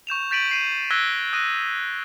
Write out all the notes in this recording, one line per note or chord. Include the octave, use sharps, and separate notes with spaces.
C#6 G6 E7 F7
G6 A6 B6 D7 D#7 F#7
G6 C7 D#7
E6 F#6 G#6 A#6 B6 G7
D#6 F#6 A#6 D#7